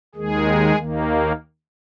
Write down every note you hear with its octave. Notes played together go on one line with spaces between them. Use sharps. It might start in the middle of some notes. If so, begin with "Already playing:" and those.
D#2 D#3 G#3 G#4
D#2 D#3 A#3